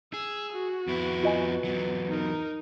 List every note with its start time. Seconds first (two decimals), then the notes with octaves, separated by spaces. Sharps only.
0.14 G#4 E6
0.53 F#4
0.87 F2 B3 E4
1.23 F4 D#5 G#5
1.64 E2 F#3
2.10 D#4 A#4